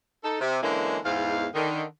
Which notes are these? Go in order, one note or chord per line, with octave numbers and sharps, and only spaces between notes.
D#4 A4
C3
D3 E3 G#3 A#3 C#4 E4
E2 G#2 F5
D3 D#3